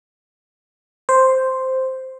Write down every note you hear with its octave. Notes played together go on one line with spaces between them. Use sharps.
C5